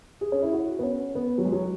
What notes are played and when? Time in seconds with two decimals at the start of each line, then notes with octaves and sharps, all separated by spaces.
0.21 G#4
0.32 C#4
0.42 E4
0.53 F#4
0.79 B3
0.83 C#4
1.15 B3
1.38 F#3
1.45 G#3
1.52 F#3